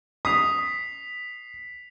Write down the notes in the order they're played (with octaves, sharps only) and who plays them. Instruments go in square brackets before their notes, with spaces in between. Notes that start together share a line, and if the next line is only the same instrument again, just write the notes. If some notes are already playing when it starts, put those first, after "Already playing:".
[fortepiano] D#6 [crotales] B6 C7 F7